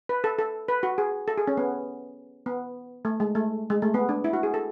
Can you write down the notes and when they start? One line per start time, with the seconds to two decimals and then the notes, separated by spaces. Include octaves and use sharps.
0.09 B4
0.24 A4
0.39 A4
0.68 B4
0.83 F#4
0.98 G#4
1.28 A4
1.38 G#4
1.47 C#4
1.57 B3
2.46 B3
3.05 A3
3.20 G#3
3.35 A3
3.70 G#3
3.82 A3
3.94 B3
4.09 D4
4.24 E4
4.33 F#4
4.43 G#4
4.54 A4